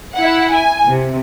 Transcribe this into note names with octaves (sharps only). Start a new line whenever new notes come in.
E4 F#5
G#5
C3